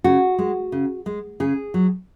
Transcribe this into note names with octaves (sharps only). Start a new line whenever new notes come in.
C#3 F#4
G#3
C#3
G#3
C#3 G#4
F#3